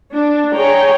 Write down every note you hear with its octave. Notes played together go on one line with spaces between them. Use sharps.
D4
G#4 C#5 G5 A#5